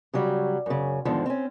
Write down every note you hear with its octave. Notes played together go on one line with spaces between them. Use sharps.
C#3 F#3 G3
F#2 C#3
E2 G#2 D3 D#3 F3
C4 C#4